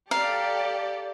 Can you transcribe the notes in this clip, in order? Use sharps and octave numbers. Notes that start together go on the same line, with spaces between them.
G4 A4 D5 F5 A#5